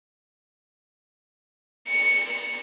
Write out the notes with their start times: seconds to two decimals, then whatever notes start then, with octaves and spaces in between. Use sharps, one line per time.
1.89 C#7